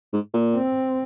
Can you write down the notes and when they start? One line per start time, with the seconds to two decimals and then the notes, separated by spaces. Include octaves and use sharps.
0.13 G#2
0.34 A#2
0.55 C4